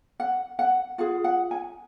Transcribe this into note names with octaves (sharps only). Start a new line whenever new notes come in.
F#5
F#5
F4 G#4 F#5
F#5
G#5